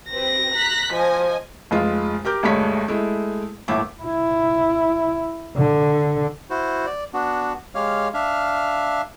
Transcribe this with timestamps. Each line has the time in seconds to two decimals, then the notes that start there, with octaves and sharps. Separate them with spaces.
0.10 C4 G4 B4 A#6
0.53 A#5 F#6 B6
0.93 F3 D#5 G#5
1.71 F1 G#3 F4
2.25 G4 A#4 D6 G6
2.43 D2 G2 G#3 A3 C#5 B6
2.88 G#3 A3 E4
3.68 G1 D#2 A2 E5 D6
4.03 E4
5.58 D3
6.50 E4 F#4 C5
6.86 D5
7.14 B3 D4 F#4
7.75 G#3 G4 C#5 F5 F6
8.14 D4 E5 F5 F6